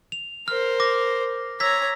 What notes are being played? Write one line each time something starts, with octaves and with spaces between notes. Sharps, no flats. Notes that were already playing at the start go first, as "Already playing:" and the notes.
F7
A#4 C5 F6
D6 A#6
C#5 A#5 E6 G#6 B6